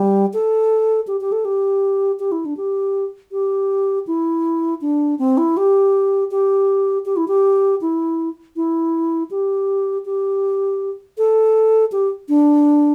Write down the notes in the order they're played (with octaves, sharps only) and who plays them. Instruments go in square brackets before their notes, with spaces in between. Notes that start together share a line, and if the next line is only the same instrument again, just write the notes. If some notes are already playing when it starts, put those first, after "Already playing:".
Already playing: [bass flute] G3
A4
G4
G4
A4
G4
G4
E4
D4
G4
G4
E4
D4
C4
E4
G4
G4
G4
E4
G4
E4
E4
G4
G4
A4
G4
D4